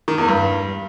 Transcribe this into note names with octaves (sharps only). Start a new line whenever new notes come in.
D#3
E2
G2